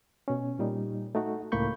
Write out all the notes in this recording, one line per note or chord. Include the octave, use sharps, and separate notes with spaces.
B2 C#4
A#2 G3 D#4
A3 D#4 F#4
C#2 A2 A#3 B5 C#6 G6